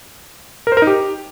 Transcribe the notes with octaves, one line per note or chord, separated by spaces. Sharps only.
A#4
C5
A#4
D#4
G4